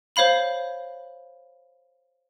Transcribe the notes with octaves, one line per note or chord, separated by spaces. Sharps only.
C5 C#5 F5 B5 F#7